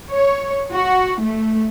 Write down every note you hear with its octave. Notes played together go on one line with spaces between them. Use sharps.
C#5
F#4
A3